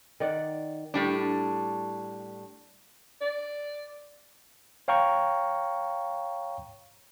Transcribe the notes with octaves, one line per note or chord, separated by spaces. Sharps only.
D#3 D5 F#5
A2 G3 D4
D5
C#5 F5 G5 A#5 C#6